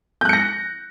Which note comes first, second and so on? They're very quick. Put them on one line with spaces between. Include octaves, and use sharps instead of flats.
G6 F#6 C#7 A#6